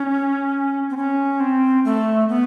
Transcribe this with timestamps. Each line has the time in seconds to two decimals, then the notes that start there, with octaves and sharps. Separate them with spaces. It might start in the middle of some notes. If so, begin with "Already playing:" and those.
Already playing: C#4
0.90 C4
0.97 C#4
1.40 C4
1.85 A3
2.29 B3